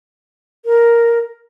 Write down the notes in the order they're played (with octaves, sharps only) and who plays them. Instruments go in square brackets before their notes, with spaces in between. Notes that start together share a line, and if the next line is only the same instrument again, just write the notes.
[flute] A#4